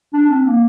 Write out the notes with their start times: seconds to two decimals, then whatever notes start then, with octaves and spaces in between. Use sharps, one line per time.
0.13 D4
0.29 C4
0.45 A#3